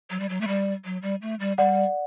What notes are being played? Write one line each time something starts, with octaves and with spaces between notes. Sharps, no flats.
F#3
G3
F#3
A3
G3
F#3
G3
A3
G3
G3 D5 F#5